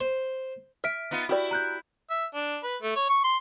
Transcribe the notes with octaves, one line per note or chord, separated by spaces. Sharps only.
C5
E5 F6 B6 D7
B3 D#4 F4
E4 F#4 G4 D5
A#5 F#6 G6
E5
D4
B4
A3
C#5
C#6
C6